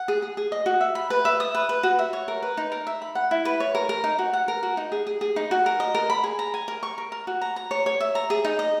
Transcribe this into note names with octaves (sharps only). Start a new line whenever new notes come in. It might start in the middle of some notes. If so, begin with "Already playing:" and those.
Already playing: F#5
G#4
G#4
G#4
D#5
F#4
E5
B5
B4
E5
D#6
B4
B4
F#4
E5
C#5
A#4
B4
D#4
A#4
E5
B5
F#5
E4
B4
C#5
A#4
A#4
D#4
F#4
F#5
A#4
F#4
D#4
G#4
G#4
G#4
D#4
F#4
A#4
D#5
A#4
B5
G#4
A#5
G#5
A#4
C#6
A#4
A#4
F#4
A#5
A#5
C#5
C#5
E5
A#5
G#4
D#4
D#5